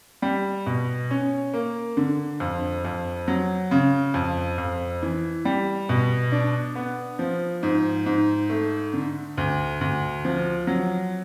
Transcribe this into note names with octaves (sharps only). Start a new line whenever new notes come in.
G3
B2
C#4
A#3
D3
F2
F2
F#3
C#3
F2
F2
E3
G3
B2
D4
B3
F3
G#2
G#2
A3
D3
D2
D2
F3
F#3